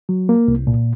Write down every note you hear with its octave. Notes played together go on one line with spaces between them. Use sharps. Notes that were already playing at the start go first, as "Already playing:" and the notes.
F#3
A#3
C2
A#2